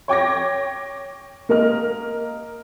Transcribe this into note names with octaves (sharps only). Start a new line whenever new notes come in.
C#5 G5 D6 G#6 A#6
A#3 A#4 D#5 F6